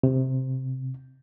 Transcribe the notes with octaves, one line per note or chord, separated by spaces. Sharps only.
C3